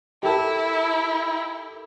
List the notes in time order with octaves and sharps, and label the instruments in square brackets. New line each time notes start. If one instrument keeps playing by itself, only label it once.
[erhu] E4 [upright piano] G4 A4 A#4